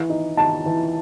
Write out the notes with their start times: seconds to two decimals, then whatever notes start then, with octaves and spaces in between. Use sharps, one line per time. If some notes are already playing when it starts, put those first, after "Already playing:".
Already playing: E3
0.10 D#4
0.37 D#4 A5
0.66 E3